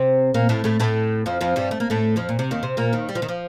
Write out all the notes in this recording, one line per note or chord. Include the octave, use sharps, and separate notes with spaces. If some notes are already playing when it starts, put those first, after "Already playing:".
Already playing: C3 C4
A#2 A#3
A2 A3
A2 A3
A2 A3
F2 F3
F2 F3
G2 G3
A3
A#3
A2 A3
F2 F3
A#2
C3
D#2 D#3
C3 C4
A#2 A#3
D#2 D#3
G3
F3
D#3
F3